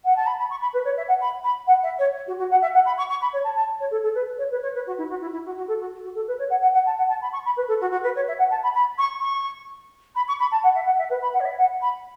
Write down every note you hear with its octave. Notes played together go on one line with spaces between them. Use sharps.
F#5
A5
B5
B5
C#6
B5
B4
C#5
E5
F#5
B5
B5
F#5
E5
C#5
F#4
F#4
F#5
E5
F#5
B5
C#6
C#6
B5
C#5
A5
A5
C#5
A4
A4
B4
C#5
B4
C#5
B4
F#4
E4
F#4
E4
E4
F#4
F#4
A4
F#4
F#4
A4
B4
C#5
F#5
F#5
F#5
A5
F#5
A5
B5
C#6
B5
B4
A4
F#4
F#4
B4
C#5
E5
F#5
A5
B5
B5
C#6
C#6
B5
C#6
B5
A5
F#5
E5
F#5
E5
B4
B5
F#5
C#5
E5
F#5
B5